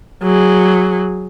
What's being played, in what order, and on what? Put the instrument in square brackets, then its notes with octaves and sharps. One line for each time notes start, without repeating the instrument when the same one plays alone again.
[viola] F#3 G#4